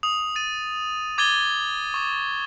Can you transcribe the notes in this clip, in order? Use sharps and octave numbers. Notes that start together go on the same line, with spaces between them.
D#6 F7
A6 D#7
D6 G#6 A6 D#7 G7
C#6 D6